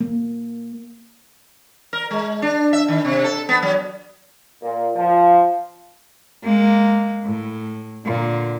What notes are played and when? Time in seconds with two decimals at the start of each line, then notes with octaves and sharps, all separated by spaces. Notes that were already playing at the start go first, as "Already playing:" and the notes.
0.01 A#3
1.93 A#4
2.11 G#3
2.42 D4
2.73 E5
2.88 D#3
3.05 C3
3.24 A4
3.49 B3
3.62 F#3
4.62 A#2
4.96 F3
6.44 G#3 A#3
7.25 A2
8.05 A#2 D3